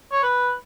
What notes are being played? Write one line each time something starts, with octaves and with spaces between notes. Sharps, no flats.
C#5
B4